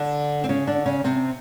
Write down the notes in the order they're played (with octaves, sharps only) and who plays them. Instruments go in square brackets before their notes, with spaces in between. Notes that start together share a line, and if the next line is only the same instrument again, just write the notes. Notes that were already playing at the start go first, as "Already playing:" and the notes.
Already playing: [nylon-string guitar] D3 D4
C4
C#3 C#4
D3 D4
C#3 C#4
C3 C4